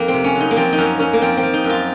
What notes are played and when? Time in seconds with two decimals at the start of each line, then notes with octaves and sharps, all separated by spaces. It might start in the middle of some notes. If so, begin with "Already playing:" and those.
Already playing: F2 A#3 D#4
0.08 C4
0.13 C3
0.24 C#4
0.35 F#3 D#4
0.51 A#3
0.56 F3 C4
0.73 D#4
0.78 F#2 C#4
0.99 F#2 C#4
1.13 A#3
1.21 F3 C4
1.37 C4
1.43 F3
1.54 D#4
1.64 F#2
1.70 F4